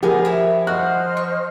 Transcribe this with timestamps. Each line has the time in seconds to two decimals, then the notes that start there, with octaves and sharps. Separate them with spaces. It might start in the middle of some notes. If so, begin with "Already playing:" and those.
0.03 F3 B3 G4 G#4 A#4 B4 G#5
0.25 E4 C#5
0.67 F#4 C5 D#5 F6 F#6
1.17 C#6